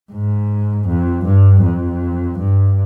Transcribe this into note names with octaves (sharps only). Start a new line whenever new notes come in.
G#2
F2
G2
F2
G2